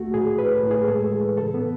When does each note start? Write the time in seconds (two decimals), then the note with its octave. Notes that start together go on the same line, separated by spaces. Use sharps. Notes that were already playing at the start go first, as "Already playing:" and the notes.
Already playing: C#2 A3 F#4
0.14 A2 G#4
0.39 A2 B4
0.55 A4
0.63 A2
0.71 G#4
0.88 G#3 A4
1.04 G#4
1.13 E3
1.21 B4
1.38 C#3 A4
1.54 B3